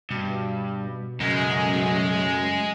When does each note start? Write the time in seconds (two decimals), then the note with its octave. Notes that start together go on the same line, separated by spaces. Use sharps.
0.11 G2 B2
1.21 F#2 C#3 F#3 G#3 A3